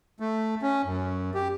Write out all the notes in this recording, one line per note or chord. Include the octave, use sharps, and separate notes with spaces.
A3
C#4
F#2
G4